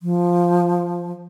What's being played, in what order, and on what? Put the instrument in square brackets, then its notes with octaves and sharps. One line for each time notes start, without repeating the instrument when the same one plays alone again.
[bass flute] F3